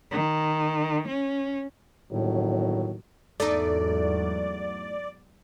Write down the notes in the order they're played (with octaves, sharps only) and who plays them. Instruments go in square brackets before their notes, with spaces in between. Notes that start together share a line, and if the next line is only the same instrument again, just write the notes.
[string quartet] D#3
C#4
[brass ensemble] G1 D#2 F#3 [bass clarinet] A2
[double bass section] E2 G#2 F#3 [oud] A3 D#4 [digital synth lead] D5